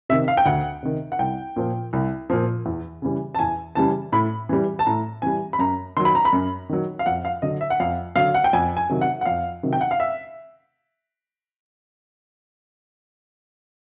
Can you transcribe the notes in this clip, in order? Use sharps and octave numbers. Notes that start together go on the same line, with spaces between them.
C3 D#3 E5
F5
G5
D2 F#5
C3 D#3
F#5
C2 G5
A#2 F3
C2
A#2 F3
E2
C#3 E3 G3
A5
E2 G#5
C#3 E3 G3 A5
A2 B5
E3 G3
A5
A2 A#5
E3 G3 G#5
B5
F#2 A#5
D#3 F#3 C6
B5
A#5
B5
F#2
D#3 F#3
F5
F2 F#5
F5
D3 F#3 D#5
E5
F#5
F2 F5
D3 F#3 F5
F#5
G5
F2 G#5
G#5
C3 D#3 F#3
F#5
F#5
F2 F5
C3 D#3 F#3
G5
F#5
F5
E5